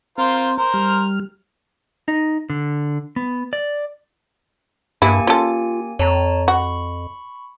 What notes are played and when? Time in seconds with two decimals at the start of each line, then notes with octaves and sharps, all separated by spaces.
0.18 C4 F4 A#4 C5
0.57 A#4 C5
0.74 G3 F6
2.08 D#4
2.50 D3
3.16 B3
3.53 D5
5.02 G2 A#3 E4 G4 G#5
5.27 C#4 F4 A4
5.99 F2 C#5 A5 A#5
6.48 F#4 B5 C#6